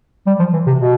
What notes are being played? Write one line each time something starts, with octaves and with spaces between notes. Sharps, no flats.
G3
F3
E3
C3
B2